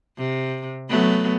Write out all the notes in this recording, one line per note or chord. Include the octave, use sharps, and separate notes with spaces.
C3
F#3 A3 B3